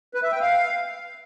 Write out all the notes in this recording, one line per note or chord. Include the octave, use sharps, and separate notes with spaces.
B4
E5
G5
F5